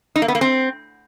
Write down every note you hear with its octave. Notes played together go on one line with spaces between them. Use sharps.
D#4
A#3
B3
A#3
C4